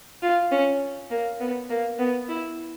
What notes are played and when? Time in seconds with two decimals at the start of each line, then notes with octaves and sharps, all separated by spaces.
0.22 F4
0.52 C#4
1.11 A#3
1.40 B3
1.70 A#3
1.99 B3
2.29 E4